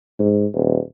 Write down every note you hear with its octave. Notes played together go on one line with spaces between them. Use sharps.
G#2
D#1